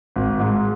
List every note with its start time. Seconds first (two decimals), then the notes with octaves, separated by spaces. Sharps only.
0.16 G#1
0.40 G#2